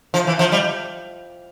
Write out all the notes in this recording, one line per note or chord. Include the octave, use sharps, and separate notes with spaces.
F3
E3
F3
G3